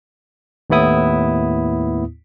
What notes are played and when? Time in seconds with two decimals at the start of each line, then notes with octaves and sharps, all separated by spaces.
0.70 D#2 A2 B3 E4 D#6